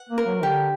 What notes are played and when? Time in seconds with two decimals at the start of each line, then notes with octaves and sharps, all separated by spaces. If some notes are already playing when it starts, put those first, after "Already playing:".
Already playing: F#5
0.09 A#3
0.18 A#4
0.26 F#3
0.43 D3 G4